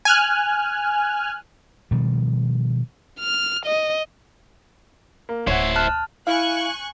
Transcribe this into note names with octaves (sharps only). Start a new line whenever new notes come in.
G#5 F6 F#6
B2 D#3 F3 G3
F6
D#5
A#3
D1 E4 C5 C#5 E5 F#5
A5 F6 F#6
E4 F5 G#5 C#6 F#6